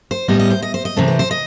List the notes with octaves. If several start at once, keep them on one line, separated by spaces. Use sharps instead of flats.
C5
A2 G3 B3 D#5
D#5
C5
D#5
C5
D#5
C3 E3 A3 C4
B4
C5
D#5